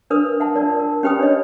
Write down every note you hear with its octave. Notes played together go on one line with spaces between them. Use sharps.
D4 A#4 B4 D#6
E5 F#5 A5
D4 F4 A#4 D5
A#4
C#4 G4 B4 G5 B5 D#6
D4 C#5 D#5